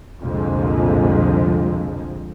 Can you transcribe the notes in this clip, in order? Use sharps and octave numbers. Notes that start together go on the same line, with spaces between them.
C2 F2 A#2 D3 F3 G#3